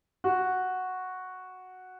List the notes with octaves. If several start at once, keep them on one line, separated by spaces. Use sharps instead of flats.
F#4